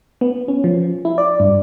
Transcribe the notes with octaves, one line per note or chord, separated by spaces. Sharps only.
B3
C#4
F3
E4
D5
G2